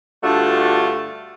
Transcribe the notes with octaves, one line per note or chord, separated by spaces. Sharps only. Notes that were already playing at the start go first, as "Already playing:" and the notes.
G2 D3 A3 F4 F#4